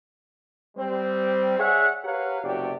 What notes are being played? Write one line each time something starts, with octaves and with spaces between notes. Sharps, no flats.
G3 C4 C5
G#4 C#5 D5 E5 F#5
G4 A#4 B4 C#5 F5 F#5
F#1 B1 C3 F#4 G4 D5